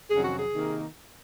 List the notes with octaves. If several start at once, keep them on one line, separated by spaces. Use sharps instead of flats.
F2 C3 D#3 F#3 C#4 G#4
F#4
G#4
C3 D#3 A#3 D#4